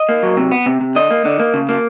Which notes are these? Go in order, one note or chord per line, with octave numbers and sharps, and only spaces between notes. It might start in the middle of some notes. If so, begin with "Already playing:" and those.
Already playing: D#5
A#3
F#3
C3
B3
C3
C3
D3 D#5
A#3
D3
A#3
C#3
A#3